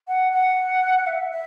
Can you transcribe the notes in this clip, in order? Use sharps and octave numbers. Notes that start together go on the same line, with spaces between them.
F#5
F#5
E5
E5